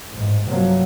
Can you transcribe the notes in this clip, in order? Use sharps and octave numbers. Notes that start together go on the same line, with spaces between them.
A1 G#2
G2 C3 F3 F#3 A#3